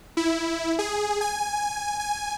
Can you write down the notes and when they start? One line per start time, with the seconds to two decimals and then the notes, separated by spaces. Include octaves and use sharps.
0.17 E4
0.79 G#4
1.21 G#5
2.00 G#5